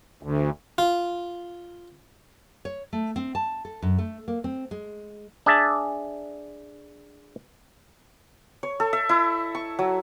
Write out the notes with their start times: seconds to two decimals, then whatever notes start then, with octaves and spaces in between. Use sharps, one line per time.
0.23 D2
0.78 F4
2.65 C#5
2.93 A3
3.16 C4
3.35 A5
3.65 A4
3.82 F#2
3.99 A3
4.28 A#3
4.44 C4
4.71 G#3
5.46 D4 G#4 E5 A5
8.63 C#5
8.80 A4
8.93 E5
9.09 E4
9.55 C#6
9.79 F#3